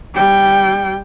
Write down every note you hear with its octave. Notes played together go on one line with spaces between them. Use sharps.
G3 G5